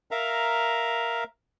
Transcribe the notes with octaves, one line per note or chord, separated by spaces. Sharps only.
A#4 E5 F5 A#5